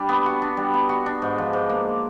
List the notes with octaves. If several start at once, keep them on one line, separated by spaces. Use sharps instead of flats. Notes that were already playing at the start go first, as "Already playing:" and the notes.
Already playing: G3 D4
B3
F#4
D4
G3
B3
F#4
D4
G#2
F3
G#2
A#3